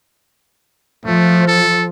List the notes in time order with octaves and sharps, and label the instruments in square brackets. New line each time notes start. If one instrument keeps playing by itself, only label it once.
[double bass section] F3 [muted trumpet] A3
[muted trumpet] A4